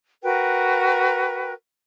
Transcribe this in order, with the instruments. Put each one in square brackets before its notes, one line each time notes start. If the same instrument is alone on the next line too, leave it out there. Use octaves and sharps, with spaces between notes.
[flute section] F#4 A#4 B4 G5